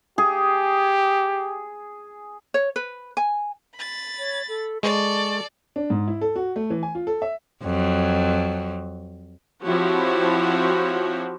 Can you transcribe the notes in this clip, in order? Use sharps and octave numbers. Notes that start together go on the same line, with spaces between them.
G4 G#4
C#5
B4
G#5
B5 A6
C#5
A4
G#3 A4 D5 C#6
D4
G#2
E4
A4
F#4
A3
E3
G#5
F4
A4
E5
F2 F#3
F3 C4 E4 F#4 G4 C#5